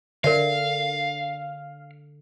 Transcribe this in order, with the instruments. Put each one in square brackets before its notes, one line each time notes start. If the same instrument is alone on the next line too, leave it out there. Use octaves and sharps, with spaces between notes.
[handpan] D3 [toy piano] A#4 D5 E5 [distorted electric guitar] F5